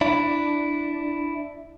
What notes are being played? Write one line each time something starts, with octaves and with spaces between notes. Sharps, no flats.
D4 E4